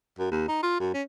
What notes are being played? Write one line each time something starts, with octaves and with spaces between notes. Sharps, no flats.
F#2
D#2
D#4
F4
F#2
C#4